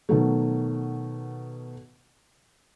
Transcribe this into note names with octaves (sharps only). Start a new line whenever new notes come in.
B2 D#3 F#3 A3